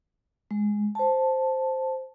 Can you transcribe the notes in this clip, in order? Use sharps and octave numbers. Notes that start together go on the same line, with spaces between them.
G#3
C5 A5